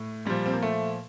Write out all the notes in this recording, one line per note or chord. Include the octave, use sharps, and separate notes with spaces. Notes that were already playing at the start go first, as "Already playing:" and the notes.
Already playing: A2
A#2 F3 G3
C4
A#3
A3